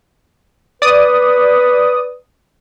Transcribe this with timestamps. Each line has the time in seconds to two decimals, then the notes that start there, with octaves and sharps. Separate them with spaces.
0.82 B4 D5 D#6